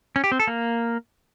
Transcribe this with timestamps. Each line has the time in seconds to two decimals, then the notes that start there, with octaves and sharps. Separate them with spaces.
0.16 C#4
0.24 G4
0.32 C4
0.40 A4
0.47 A#3